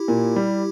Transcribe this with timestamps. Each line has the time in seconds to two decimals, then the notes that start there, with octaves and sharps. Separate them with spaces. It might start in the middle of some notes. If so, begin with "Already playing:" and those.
Already playing: E4 G4
0.08 A#2
0.36 G3